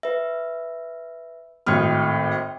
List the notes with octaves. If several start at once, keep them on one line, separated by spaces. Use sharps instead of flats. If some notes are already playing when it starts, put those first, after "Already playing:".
B4 E5
G#1 A2 G5 D#6 F6